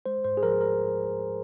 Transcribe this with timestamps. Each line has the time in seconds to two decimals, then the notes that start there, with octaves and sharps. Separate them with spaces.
0.06 G#3 C5
0.24 G#2 C5
0.37 G#4
0.43 F3 A#4
0.61 A#4